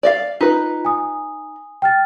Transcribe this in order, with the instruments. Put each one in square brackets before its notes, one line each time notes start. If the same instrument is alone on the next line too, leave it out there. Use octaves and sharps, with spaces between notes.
[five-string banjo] D5 D#5 F5
[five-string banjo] D#4 B4 [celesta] F4 B5 B6
[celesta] G#5 D#6
G5 F6 A6